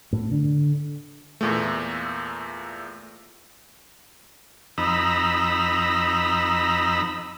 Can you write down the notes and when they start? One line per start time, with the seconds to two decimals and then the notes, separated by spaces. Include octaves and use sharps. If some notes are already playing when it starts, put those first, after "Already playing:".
0.13 A2
0.31 D3
1.41 E2 A#2 A3
4.78 F2 D#4 A#5 B5 E6